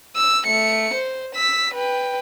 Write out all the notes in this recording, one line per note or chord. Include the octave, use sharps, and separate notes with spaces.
E6
A3 C#7
C5
E6 B6
B4 G5